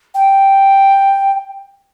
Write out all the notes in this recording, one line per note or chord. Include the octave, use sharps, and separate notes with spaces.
G5